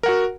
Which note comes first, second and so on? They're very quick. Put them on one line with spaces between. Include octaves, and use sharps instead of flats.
A#4 F#5 F#4